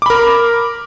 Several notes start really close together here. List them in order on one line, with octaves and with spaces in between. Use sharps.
D6 B5 A#4